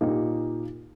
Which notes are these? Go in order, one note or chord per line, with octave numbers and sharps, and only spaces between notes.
A#2 A#3 D#4 G4